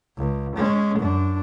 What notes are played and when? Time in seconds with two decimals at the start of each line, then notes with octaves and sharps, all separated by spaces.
0.17 C#2
0.55 G#3 C#4
0.98 F#2 D4